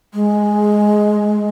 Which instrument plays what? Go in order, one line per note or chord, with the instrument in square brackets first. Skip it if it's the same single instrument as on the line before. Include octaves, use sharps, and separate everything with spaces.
[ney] G#3